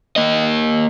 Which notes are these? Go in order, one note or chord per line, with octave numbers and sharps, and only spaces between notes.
A#3 D#5